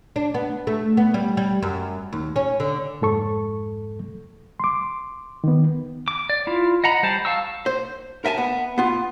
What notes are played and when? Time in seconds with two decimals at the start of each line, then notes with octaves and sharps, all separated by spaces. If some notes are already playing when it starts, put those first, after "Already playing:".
0.16 D4
0.34 B3
0.67 A3
0.97 B3
1.14 G3
1.37 G3
1.62 F#2
2.13 D#2
2.36 C#4
2.60 D3
3.01 F2 G#2 A4 C#6
4.60 C6 D6
5.44 D#3 B3
6.08 D6
6.30 D5
6.47 E4 F4
6.84 D#5 F#5 A#5 B5
7.03 G3 C5 A5
7.25 F5 A5 C#6 E6
7.66 C5
8.25 A#4 E5 G#5 A5
8.38 B3
8.78 B3 F4